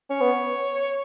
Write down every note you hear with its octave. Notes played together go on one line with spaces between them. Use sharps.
C#4 C#5
B3